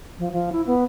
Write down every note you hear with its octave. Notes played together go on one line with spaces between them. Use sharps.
F3
F3
E4
B3